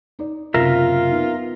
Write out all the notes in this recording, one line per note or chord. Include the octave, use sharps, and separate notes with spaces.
D#4 D5
F#1 C3 C#4 F4 A#4 E5
B3 D#4